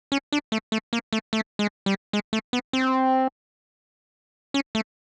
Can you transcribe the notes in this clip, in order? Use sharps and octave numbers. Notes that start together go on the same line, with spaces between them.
C#4
D4
A3
A3
A#3
A3
A3
G#3
G3
G#3
A3
B3
C4
C#4
A3